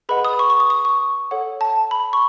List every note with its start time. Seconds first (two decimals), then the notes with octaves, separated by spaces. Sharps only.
0.09 G#4 B4 D#5 F#5 B5
0.24 D#6
0.39 C#6
0.50 C#6
0.60 D#6
0.70 D#6
0.85 C#6
1.31 A4 C#5 F#5
1.61 A5
1.91 B5
2.13 C#6